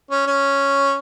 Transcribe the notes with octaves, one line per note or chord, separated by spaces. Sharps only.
C#4
C#4